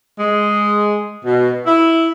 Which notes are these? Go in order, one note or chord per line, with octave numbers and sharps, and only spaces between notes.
G#3
B2
E4